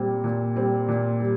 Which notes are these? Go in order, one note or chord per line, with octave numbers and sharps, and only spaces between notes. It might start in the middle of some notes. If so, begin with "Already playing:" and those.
Already playing: A#2 G3 C4
A#2
G3 C4
A#2
G3